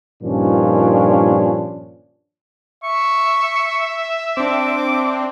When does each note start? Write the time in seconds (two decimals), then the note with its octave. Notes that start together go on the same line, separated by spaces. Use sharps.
0.23 G2 A#2 D#3 F3 C#4 D4
2.84 E5 C#6
4.37 C4 D4 D6